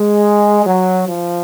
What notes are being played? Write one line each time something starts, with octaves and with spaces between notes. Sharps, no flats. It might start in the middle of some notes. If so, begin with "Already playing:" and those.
Already playing: G#3
F#3
F3